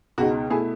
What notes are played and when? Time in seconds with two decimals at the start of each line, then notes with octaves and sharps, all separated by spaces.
0.18 C#2 B2 G#3 D#4 F#4
0.50 B2 A3 E4 G#4